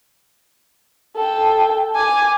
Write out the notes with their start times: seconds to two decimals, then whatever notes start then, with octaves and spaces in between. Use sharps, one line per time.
1.16 A4 G5
1.95 G#5 D6